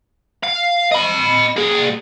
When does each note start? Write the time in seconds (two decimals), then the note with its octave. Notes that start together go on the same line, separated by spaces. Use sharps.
0.43 F5
0.91 D#5 B5
1.56 A#3 G#4